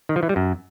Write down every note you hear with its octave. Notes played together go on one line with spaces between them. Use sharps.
D#3
F3
E3
G3
F#2